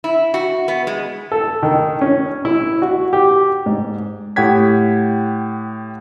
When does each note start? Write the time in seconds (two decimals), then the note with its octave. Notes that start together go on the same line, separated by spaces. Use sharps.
0.04 E4
0.34 F#4
0.68 B3
0.87 G#3
1.32 A4
1.63 D#3
2.01 C#4
2.45 E4
2.82 F#4
3.13 G4
3.66 G#2
4.36 A2 G4 F#5 G5 G#6 B6